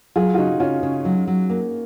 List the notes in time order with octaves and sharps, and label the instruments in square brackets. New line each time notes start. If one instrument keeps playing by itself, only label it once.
[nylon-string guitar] F#3 [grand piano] F4 G#4
[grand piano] F4
[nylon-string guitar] C#3 [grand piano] D#4 F#4
[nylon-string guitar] C#3 [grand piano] C#4 F4
[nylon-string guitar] C#3
F#3
F#3
A#3